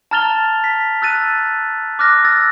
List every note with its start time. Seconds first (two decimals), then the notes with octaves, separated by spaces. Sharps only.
0.11 A5 A#5 F6 A6 F7 G7
0.64 B6
1.02 E6 F#6 A6 D#7
1.99 D6 F6 F#6 A#6
2.24 E6 A6